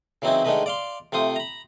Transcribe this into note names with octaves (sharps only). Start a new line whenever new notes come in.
C#3 E3 F#3 C4 D#4 E4
D3 D#3 G#3 A3 D#4 B4
D5 F5 C6
C3 A3 F4 C5 D#6
A#5 B5